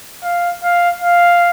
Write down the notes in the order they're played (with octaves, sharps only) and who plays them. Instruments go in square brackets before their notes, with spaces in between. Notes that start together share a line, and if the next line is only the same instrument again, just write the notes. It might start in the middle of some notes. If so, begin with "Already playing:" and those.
[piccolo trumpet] F5
F5
F5